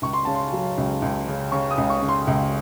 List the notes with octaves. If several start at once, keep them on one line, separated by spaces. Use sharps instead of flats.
C#2 C#6
C6
C#3 A5
C6
F#3
C#2
C#2
C#3
C#3 C#6
D#6
C#2
C#6
C#3
C6
C#2